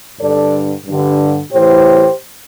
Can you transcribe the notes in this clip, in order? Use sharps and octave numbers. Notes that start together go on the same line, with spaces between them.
G2 D3 A4 D5
G2 D3
A2 E3 G4 C5